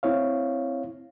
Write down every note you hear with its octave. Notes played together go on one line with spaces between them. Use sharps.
C4 E4 C#5 F5